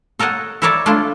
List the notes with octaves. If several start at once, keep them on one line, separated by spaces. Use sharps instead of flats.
A4 A#4 C#5 D#5 F#5
E4 A4 A#4 C#5 D5 E5
A3 D4 E4 F4